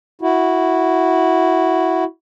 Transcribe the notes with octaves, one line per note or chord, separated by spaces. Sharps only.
E4 F#4